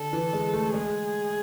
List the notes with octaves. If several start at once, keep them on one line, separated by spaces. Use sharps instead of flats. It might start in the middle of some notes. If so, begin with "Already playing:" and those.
Already playing: D3 A4
E3
G#3
A3
G#3 G#4